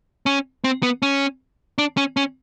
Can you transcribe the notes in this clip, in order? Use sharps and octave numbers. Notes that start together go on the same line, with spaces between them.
C#4
C4
B3
C#4
D4
C#4
C#4